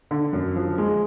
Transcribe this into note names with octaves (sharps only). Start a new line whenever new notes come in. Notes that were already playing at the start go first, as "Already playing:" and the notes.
D3
F#2
F3
G#3